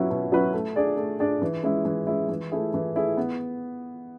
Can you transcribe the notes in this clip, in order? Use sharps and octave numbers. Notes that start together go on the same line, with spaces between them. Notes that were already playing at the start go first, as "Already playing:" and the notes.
Already playing: B2 F#3 C#4 E4 B4
B2
F#3 C#4 E4 B4
A3
D4 G#4 D5
A3
D4 G#4 D5
E3
G#3 C#4 E4
E3
G#3 C#4 E4
E3
A3 E4 G#4
E3
A3 E4 G#4
B3